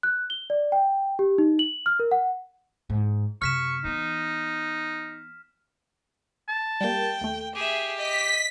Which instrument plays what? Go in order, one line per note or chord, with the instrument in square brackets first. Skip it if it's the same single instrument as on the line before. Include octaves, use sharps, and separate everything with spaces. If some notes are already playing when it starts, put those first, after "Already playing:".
[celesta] F#6
G7
D5
G5
G4
D#4
F#7
F6
A#4
F#5
[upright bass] G#2
[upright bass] F#2 C3 [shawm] C#6 [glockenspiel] F6 B6 E7
[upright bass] E3 B3 [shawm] D#4
[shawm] A5
[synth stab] G3 A#3 [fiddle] G5
[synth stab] D#2 A3
[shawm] G4 [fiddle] G#4 E5
[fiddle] D#5 [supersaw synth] B6